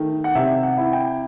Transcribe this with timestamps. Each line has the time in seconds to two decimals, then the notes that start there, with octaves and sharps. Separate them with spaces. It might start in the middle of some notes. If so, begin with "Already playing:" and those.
Already playing: D#3 A3
0.24 F#5
0.35 C3 E5
0.63 F#5
0.78 E4
0.93 G5